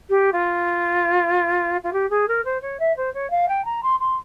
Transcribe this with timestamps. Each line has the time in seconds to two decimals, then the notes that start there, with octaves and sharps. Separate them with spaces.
0.09 G4
0.32 F4
1.83 F4
1.93 G4
2.10 G#4
2.28 A#4
2.44 C5
2.61 C#5
2.79 E5
2.96 C5
3.13 C#5
3.30 F5
3.48 G5
3.65 A#5
3.83 C6
3.99 C6